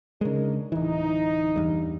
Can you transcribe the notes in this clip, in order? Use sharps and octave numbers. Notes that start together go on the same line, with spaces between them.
C#3 G#3 D4 D#4 A#4
D1 E3 D#4
E2 G2